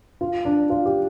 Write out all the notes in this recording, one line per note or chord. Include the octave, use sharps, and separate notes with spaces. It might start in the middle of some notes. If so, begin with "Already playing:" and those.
F4
D4
F4
G4